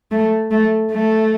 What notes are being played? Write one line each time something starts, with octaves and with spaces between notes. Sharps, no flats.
A3
A3
A3